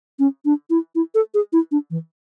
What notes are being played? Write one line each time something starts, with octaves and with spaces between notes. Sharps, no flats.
C#4
D4
E4
E4
A4
G#4
E4
D4
E3